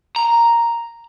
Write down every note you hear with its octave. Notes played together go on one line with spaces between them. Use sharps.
A#5